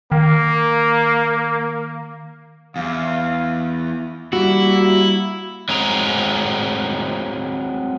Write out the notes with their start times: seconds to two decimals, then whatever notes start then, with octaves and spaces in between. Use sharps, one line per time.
0.12 D#3 A#3
2.76 E2 F5
4.33 G3 A#3 E4 F#4
5.69 F#3 G#3 C4 G#4 A#5